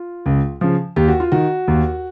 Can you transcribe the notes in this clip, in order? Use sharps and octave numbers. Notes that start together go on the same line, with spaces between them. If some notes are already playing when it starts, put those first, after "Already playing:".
Already playing: F4
C#2
C#3 F3
D#2 G4
F#4
F4
D#3 F#4
D#2